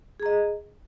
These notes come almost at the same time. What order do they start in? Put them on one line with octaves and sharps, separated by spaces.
G#4 A#5 D#5